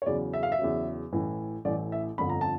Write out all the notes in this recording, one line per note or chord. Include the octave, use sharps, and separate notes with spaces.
C#5
E2 C#3 F#3 D5
E5
F5
E5
E2 C#3 F#3
A1 A2 E3
A1 A2 E3 D5
E5
G1 F2 D3 B5
A#5
A5